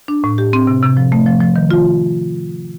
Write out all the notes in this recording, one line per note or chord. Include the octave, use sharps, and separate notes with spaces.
D4
A2
G4
C4
C3
C3
F3
A3
F3
F3
D#3
F4